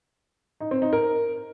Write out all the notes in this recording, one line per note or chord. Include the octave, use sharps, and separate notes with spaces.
D#4
C4
D#4
A#4